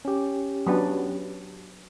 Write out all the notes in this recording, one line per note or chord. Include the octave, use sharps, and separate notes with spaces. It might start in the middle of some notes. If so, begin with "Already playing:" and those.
C#4 G4
F#3 B3 D4